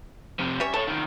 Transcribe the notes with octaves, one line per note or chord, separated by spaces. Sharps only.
F2 C3
G3 C#4 C#5 E5
A4 C#5 A5
C2 D#3